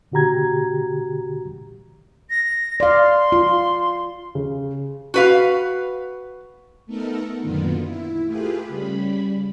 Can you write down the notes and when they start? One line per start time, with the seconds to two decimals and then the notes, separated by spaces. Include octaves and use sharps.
0.12 A#2 D3 F#4 G4 A#5 G#6
2.29 A#6
2.80 D5 F5 C6
3.32 F4
4.35 C#3
5.14 F#4 B4 F5
6.86 A3 B3 D#4 A4 A#4
7.41 F#2 A#2 D3 D#3 B3 F4
7.83 E4
8.26 A3 F4 G4 G#4 B4
8.68 C#3 G3 B5